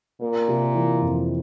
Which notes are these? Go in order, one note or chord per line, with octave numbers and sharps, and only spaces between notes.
A#2 A#3
C3
E3
F2